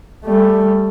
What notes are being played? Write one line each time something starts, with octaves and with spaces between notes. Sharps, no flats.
G3 A3